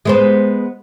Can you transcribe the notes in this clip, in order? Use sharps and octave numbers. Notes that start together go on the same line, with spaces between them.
G#3 B3 C5